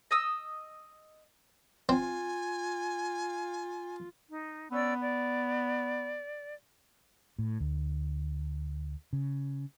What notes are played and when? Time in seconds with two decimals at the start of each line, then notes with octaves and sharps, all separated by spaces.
0.11 D#5 D#6 E6
1.89 C4 F4 G#5
4.29 D#4
4.71 B3 C#4 D5 E6
5.01 D5
7.39 A2
7.60 D2
9.13 C#3